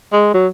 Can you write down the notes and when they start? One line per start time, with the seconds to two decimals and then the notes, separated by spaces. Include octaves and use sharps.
0.13 G#3
0.34 F#3